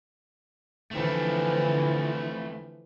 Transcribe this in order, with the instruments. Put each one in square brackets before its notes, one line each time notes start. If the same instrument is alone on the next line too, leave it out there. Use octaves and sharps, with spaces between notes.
[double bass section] D3 E3 F3 [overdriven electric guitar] A3 C4